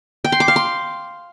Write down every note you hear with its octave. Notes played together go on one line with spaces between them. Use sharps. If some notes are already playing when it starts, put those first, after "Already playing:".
G5
C6
D6
F5
C6